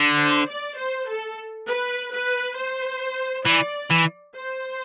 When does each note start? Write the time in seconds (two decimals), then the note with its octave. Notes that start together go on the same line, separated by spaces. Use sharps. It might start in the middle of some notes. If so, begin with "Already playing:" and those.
Already playing: D3
0.18 C5
0.48 D5
0.77 C5
1.08 A4
1.67 B4
2.12 B4
2.56 C5
3.45 E3 D5
3.91 E3
4.35 C5